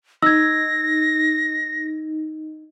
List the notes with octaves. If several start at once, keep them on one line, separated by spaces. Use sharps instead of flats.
D#4 E6 G#6 A#6